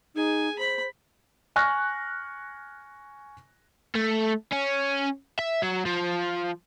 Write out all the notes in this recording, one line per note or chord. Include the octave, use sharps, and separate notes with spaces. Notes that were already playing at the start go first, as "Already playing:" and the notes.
D#4 G#4 G#5
C5 B5
G#5 C#6 F6 F#6 A#6
A3
C#4
E5
F#3
F3